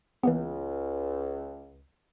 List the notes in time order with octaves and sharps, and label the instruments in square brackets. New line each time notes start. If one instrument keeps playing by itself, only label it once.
[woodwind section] C#2 [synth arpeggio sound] E3 A#3 B3